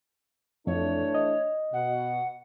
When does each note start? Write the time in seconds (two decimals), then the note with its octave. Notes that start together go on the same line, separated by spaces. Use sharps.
0.67 F2 E3 A3 D4 C#5
1.14 D#5
1.73 B2 F#5